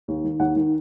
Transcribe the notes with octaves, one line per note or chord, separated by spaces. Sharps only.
D#2
D#3
D#2 F#5
D#3